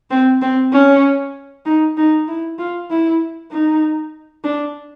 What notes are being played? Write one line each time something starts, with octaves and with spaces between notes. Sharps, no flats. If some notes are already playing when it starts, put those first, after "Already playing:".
C4
C4
C#4
D#4
D#4
E4
F4
E4
D#4
D4